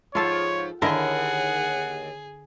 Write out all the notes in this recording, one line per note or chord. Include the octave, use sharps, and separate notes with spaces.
G#2 F3 F4 A4 C#5 F5
D#2 D3 E4 G#4 A#4 D#5 F#5